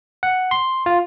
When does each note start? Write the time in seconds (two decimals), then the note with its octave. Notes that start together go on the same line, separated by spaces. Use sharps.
0.23 F#5
0.51 C6
0.86 F4